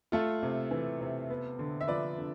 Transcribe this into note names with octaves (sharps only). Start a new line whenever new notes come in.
A3 F4 A4
C3
E3
C3
B3
D3
E5
F3 B4 D5
D3